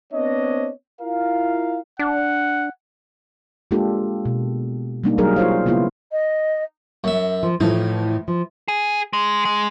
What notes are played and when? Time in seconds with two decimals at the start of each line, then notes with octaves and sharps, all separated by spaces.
0.12 B3 C4 D4 C#5 D#5
1.00 E4 F4 A#4 F5
1.99 D4 F#5
3.71 G#3 A#3 D4 F4 G4 A4
4.25 B2
5.04 G3 G#3 A#3 D4 D#4
5.18 F#3 G3 D#4 G#4 A#4
5.36 F4 C5 C#5 F5
5.66 C#3 A#3 B3 E4 F4
6.12 D#5
7.04 F#2 E5
7.43 F3
7.60 A2 E3 F3 A3 D#4
8.28 F3
8.68 G#4
9.13 G#3
9.45 G#3